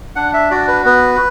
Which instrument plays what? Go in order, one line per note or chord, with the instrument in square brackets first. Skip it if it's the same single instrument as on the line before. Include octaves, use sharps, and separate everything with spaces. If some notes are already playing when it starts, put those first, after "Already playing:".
[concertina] D4 F#5
E5
F#4 D5
B4
B3 B4